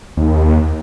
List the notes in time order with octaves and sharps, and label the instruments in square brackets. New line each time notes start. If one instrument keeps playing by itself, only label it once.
[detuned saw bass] D#2